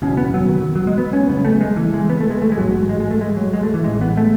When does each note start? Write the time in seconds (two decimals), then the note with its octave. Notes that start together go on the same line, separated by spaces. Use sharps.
0.02 F#1 E2 B2 C#4
0.17 B3
0.34 F#3
0.49 D#3
0.76 F#3
0.87 G#3
0.98 B3
1.13 C#4
1.29 F#1 F#2 C#3 B3
1.45 A3
1.61 G#3
1.77 E3
1.94 G#3
2.10 B3
2.20 A3
2.30 G#3
2.42 A3
2.52 G#3
2.57 A1 G#2 F#3
2.89 G#3
3.00 G#3
3.11 A3
3.21 G#3
3.37 F#3
3.53 G#3
3.63 A3
3.74 E3
3.84 A1 A2 G#3
4.01 B3
4.17 A3